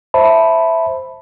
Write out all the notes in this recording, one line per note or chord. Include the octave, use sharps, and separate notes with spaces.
C5 E5 A5 B5